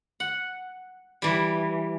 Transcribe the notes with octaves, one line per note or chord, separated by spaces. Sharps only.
F#5
E3 G3